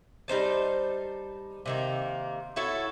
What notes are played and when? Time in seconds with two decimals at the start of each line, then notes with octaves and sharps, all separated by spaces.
0.28 G3 D#4 C5 A5
1.66 C3 D#3 A#3
2.56 E4 F#4 A4 C#5